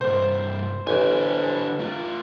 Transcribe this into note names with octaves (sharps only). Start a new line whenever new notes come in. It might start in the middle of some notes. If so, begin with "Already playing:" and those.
C2 G2 C5
A1 D3 G#5
A3 F4